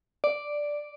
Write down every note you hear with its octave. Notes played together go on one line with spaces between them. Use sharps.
D5